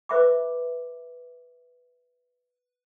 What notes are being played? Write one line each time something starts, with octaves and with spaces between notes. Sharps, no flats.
B4 C5 E5 B5 D6